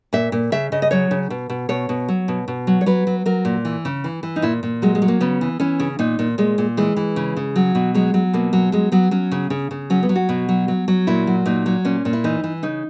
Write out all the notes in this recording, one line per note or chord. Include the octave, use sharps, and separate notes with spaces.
A#2 E5
A#2
C#3 E5
C#3 D#5
D#5
F#3 C#5
C#3
B2
B2
B2 C#5
B2
F#3
B2
B2
F#3
C#5
F#3 B4
F#3
F#3 A#4
A#2
E3
C#3
E3
E3
D#4
A#2 E4
A#2
F#3 G#3
G#3
F#3
A#3
C#3 B3
E3
E3 C#4
C#3
A#2 D#4
A#2
A#2 G#3
A#2
E3 G#3
E3
C#3
C#3
F#3
B2
F#3 G#3
F#3
B2 A#3
F#3
F#3 G#3
F#3 B3
F#3 C#4
C#3
C#3
C#3
F#3 C#4
B3
F#3
F#4
B2
F#3
F#3
F#3
A#2 E4
F#3
A#2 D#4
F#3
A#2 C#4
A#2
E4
E3 D#4
E3
C#3 D#4